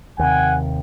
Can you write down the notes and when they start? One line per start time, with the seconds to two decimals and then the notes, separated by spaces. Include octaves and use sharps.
0.19 D#2 C3 F#5 G#5